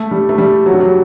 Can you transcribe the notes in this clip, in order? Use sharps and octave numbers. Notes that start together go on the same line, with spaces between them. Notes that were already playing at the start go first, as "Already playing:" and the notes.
Already playing: A3
G3
A3
G3
F#3
G3
F#3